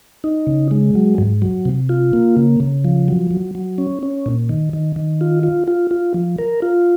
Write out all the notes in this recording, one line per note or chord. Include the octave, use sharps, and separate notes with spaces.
D#4
C#3
G#3
F#3
G#2
F#3
C3
F4
A#3
C#3
C#3
F3
F#3
F#3
F#3
C#4
C#4
A#2
D#3
D#3
D#3
F4
F4
F4
F4
F3
A#4
F4